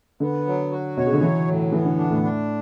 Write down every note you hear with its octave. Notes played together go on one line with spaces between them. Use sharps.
D3 B3
F#3
F#4
B2 C#5
C#3
D3
E3 F#3
A2
E3 B3
D3
D4
A2
D4